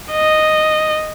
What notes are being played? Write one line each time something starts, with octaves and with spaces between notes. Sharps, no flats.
D#5